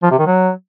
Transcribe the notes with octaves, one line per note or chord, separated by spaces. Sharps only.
F3
C3
D#3
F#3